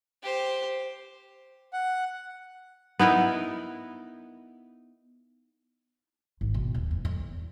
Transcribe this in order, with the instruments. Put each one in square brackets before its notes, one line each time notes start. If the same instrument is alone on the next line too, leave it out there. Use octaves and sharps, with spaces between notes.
[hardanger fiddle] G4 C5
[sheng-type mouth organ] F#5
[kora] B3 D#4 E4 A#4
[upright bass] G#1
B2
D#1
F2
F2
E2